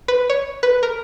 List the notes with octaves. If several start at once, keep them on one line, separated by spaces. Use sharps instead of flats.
B4
C#5
B4
A#4